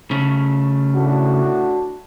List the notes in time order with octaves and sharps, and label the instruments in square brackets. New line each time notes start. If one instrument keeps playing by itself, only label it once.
[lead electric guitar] C#3 A3
[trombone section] A2 D4 F#4